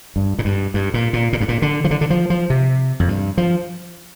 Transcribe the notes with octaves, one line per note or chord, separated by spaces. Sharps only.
G2
A#2
G2
G2
A#2
A#2
A#2
G2
A#2
D3
F3
D3
D3
F3
F3
C3
F2
G2
F3